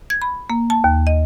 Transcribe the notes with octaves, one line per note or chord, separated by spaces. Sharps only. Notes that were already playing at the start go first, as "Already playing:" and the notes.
G#6
B5
A#3
A5
D#2
D#5